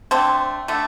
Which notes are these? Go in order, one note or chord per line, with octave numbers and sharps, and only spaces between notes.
D3 A3 C4
D3 A3